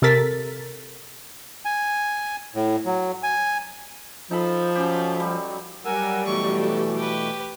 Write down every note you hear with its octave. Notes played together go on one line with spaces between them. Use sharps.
C3 A4 A#4 A6 B6
G#5
A2
F#3
G#5
F3 D#4 A4 B5
F#3 C#4 G4
F#3 G3
F#3 G3 A#4 F#5 G#5 E6
B2 E3 A3 C#6
A4
G4 B4